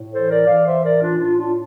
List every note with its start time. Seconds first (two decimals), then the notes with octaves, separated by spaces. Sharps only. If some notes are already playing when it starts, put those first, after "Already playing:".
Already playing: A2
0.11 E3 A4 C5
0.28 A#4 D5
0.46 E3 D5 F5
0.64 C5 E5
0.82 A2 A#4 D5
1.00 D4 F4
1.17 A2 D4 F4
1.35 D4 F4